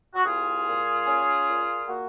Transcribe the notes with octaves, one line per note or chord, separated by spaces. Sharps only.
F#4
C2 F4 G#4
A#2
C#4
A#2
A#3 F#4